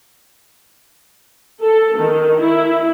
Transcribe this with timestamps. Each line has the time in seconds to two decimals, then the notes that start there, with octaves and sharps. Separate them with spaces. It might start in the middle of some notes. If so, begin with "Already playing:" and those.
1.63 A4
1.98 D#3
2.41 E4